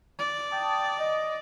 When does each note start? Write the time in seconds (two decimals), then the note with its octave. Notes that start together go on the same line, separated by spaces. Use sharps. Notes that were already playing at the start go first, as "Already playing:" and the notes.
0.19 D5
0.51 G5 A5 D#6
0.98 D#5